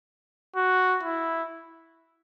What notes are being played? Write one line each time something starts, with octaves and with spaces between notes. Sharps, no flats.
F#4
E4